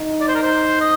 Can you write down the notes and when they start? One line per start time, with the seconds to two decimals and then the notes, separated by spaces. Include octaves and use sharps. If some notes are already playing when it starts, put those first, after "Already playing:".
Already playing: D#4
0.21 D5
0.28 C5
0.35 A#4
0.42 C5
0.81 D#5